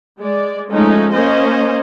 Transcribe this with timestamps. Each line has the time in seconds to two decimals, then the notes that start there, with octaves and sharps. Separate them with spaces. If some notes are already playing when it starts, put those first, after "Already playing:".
0.19 G#3 D5
0.71 F3 G#3 A3 C#4 D#4
1.13 A#3 C#4 C5 D#5